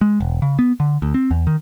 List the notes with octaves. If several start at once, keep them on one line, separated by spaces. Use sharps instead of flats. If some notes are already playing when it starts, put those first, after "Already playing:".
G#3
E1
C#3
B3
D3
D2
C4
E2
D#3